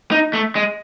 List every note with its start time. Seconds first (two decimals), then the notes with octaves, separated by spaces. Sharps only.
0.11 D#4
0.33 A3
0.55 G#3